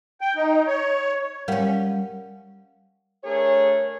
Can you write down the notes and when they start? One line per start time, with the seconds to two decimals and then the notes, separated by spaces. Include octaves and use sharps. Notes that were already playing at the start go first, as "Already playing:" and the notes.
0.21 G5
0.36 D#4
0.67 C#5
1.48 G3 C#4 A#4 F5 F#5
3.24 A3 D4 G#4 A#4 C#5